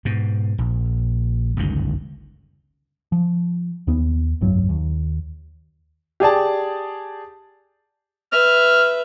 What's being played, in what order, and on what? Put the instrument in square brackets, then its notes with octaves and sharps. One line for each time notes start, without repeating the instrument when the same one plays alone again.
[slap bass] G#2 B2
A#1
G1 C#2 F#2 D#3
[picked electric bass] F3
D#2 B3
F1 B1 G2 F#3
D#2
[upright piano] G4 G#4 D5 A5
[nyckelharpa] B4 E5 [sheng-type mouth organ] F6